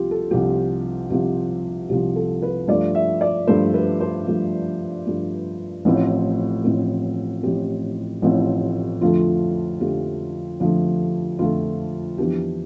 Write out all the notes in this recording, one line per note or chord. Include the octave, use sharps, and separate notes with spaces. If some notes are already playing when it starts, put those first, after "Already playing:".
Already playing: C2 C3 F3 F4 G4
A4
C2 C3 F3 G4
C2 C3 F3 G4
C2 C3 F3 G4
A4
B4
G2 F3 A3 D5
E5
D5
G2 F3 A3 C5
B4
C5
G2 F3 A3
G2 F3 A3
A1 A2 F3 C4
A1 A2 F3 C4
A1 A2 F3 C4 G4
A1 A2 F3 C4
F2 D3 F3 A3 F4
F2 D3 F3 A3 G4
F2 D3 F3 A3
F2 D3 F3 A3 F4
F2 E3 B3 D4 G4